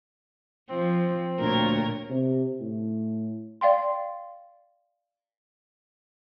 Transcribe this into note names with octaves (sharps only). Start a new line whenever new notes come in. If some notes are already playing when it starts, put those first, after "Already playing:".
F3 C4
D2 A#2 A#4 C#5
C3
A2
D5 F5 G5 C6